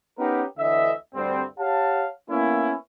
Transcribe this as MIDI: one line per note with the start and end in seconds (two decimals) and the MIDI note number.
0.19 0.43 59
0.19 0.43 61
0.19 0.43 63
0.19 0.43 67
0.19 0.43 70
0.19 0.43 71
0.59 0.93 38
0.59 0.93 50
0.59 0.93 52
0.59 0.93 75
0.59 0.93 76
1.15 1.43 38
1.15 1.43 43
1.15 1.43 55
1.15 1.43 60
1.60 2.08 67
1.60 2.08 73
1.60 2.08 77
1.60 2.08 78
1.60 2.08 81
2.30 2.74 58
2.30 2.74 59
2.30 2.74 61
2.30 2.74 64